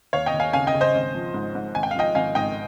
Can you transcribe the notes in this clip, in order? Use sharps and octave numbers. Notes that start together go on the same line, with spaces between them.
D#2 C#5 F5
D#5 G5
D#2
F5 G#5
C#3 F5 G#5
D#5 G5
C#3
C5 D#5
G#1
F3
G#2
G#2
G#1 G#5
G5
F5
F3 D#5 G5
G#1 F5 G#5
G#2 D#5 G5